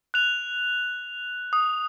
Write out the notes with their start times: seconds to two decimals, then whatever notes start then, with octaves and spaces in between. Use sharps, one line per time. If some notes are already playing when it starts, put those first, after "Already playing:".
0.14 F#6 F7
1.53 D#6